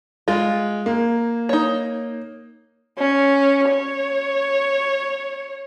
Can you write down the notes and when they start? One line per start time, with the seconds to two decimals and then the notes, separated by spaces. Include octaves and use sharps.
0.28 G#3 F4
0.86 A#3
1.49 D#4 C#5
2.98 C#4
3.70 C#5